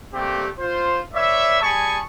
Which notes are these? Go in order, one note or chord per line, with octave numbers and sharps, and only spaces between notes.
G3 A3 A#3 C4 G4
F4 C5
B4 C#5 D5 E5
G3 G#4 G#5 A5 B5 C#6